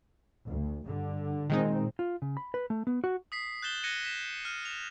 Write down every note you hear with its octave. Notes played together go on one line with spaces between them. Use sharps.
D2
G2 D3
A#2 D#3 G#3 C4 D#4
F4
C#3
B5
B4
A3
B3
F#4
D#6 B6 C7
F#6 G6 A6 E7 G7
F#6 G#6 A#6 C#7 D#7
B6 E7
F6 D#7
E7 F7